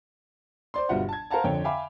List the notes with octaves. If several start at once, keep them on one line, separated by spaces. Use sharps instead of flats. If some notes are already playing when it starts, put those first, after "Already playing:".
C5 D5 C6
G1 B2 G3 F4 E5 F#5
A5 G#6
A#4 C5 F5 F#5 A5 A#5
F2 D3 C4 C#5 G5
E5 F5 G5 G#5 B5 D6